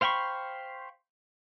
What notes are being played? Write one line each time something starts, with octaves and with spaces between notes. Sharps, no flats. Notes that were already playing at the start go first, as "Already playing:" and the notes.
C5 F5 G5 B5 C#6